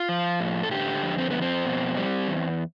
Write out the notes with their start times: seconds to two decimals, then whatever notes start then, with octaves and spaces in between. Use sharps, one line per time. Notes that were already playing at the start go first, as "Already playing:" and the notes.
Already playing: F4
0.09 F3
0.40 A2
0.63 A4
0.71 D3 G4
1.02 F2
1.18 C4
1.30 F2 B3
1.42 C4
1.66 B2
1.97 G3
2.28 E2